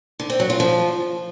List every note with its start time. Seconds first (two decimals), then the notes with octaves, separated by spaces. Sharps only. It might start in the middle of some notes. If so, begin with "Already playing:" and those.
0.20 D3
0.30 C4
0.40 F#3
0.50 F4
0.60 F3